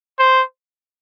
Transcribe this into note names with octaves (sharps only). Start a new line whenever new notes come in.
C5